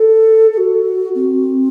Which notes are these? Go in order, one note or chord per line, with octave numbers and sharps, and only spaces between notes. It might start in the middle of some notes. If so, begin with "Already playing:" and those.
Already playing: A4
A4
F#4
C4